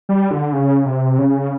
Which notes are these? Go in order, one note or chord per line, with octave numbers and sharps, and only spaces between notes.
G3
D3
C#3
C3
C#3